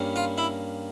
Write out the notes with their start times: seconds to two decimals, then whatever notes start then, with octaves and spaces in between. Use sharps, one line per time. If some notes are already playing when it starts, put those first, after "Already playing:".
Already playing: G2 G3 A#3 C#4
0.16 F4
0.38 E4